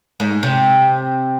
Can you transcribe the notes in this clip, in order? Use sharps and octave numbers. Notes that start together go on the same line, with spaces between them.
G#2
C3